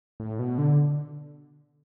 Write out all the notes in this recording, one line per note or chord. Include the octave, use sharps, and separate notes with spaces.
A2
B2
D3